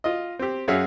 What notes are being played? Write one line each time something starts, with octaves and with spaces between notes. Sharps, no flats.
F4 D#5
C4 G4
F#2 F#4 G#4 C#5 E5 F5